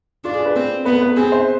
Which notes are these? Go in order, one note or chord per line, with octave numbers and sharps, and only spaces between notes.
D4 F4
G#4
B4
C4
B3 B4
B4
C4 G#4
C5